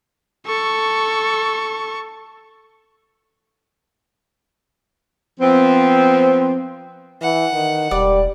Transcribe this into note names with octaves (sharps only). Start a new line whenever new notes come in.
A4 C#6
F3 B3 C4
E3 F#5
D#3
E1 G3 D5